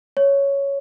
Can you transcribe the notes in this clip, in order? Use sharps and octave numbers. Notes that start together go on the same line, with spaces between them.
C#5